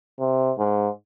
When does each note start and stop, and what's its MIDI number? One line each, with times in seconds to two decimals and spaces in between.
0.20 0.53 48
0.59 0.89 44